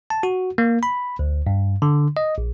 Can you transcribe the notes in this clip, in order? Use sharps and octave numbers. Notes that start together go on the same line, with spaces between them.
A5
F#4
A#3
B5
D2
G2
D3
D#5
A#1